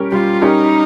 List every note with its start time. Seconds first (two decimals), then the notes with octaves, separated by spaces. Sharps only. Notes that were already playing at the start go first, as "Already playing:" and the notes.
Already playing: G3 C#4 G4 A#4
0.12 G3 F4
0.42 C#4 D#4 G4 A#4